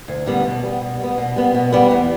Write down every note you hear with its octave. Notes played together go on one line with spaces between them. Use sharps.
D2
D3 G3 B3 D4
B2
G3 B3
B2
G3 B3
B2
G3 B3
B2
G3 B3
E2